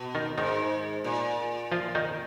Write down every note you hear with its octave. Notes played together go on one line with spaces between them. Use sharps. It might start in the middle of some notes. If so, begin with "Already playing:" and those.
Already playing: B2
D#3 D#4
G#2 D#3 D#4
A#2
F3 F4
D#3 D#4